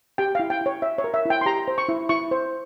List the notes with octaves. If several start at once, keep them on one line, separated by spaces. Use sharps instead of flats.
G4 G5
E4 F5
G5
E4 C#5
C#5 E5
C#5
A#4
E5
E4 G5
C6
G4 A#5
C5
C#6
E4
E4 C#6
C5